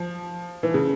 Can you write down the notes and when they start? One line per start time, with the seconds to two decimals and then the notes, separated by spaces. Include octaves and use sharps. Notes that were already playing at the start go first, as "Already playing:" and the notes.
Already playing: F3
0.63 E3
0.74 C#3